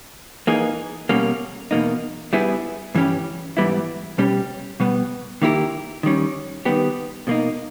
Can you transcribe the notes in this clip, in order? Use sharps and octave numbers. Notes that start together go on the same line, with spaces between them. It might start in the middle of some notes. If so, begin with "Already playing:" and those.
E3 A#3 D#4 G#4
B2 G3 A#3 C#4
E2 B2 A#3 D#4
G3 B3 E4 G#4
G2 E3 G3 C#4 G4
G#2 E3 G3 B3 E4
B2 G3 C#4 G4
B2 G3 B3
D#3 A#3 E4 G4 A#4
D#3 G3 C#4
D#3 G3 B3 G4
B2 A#3 D#4